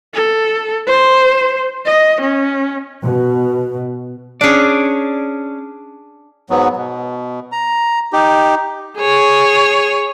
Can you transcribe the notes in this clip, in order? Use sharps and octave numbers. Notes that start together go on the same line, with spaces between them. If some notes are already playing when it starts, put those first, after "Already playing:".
A4
C5
D#5
C#4
B2
C#4 D4 G#4 D5
G#2 F#3 B3
B2
A#5
D#4 G4
G#4 C#5